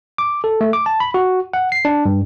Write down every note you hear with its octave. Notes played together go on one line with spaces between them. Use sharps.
D6
A4
A3
D6
A5
B5
F#4
F#5
C7
D4
G2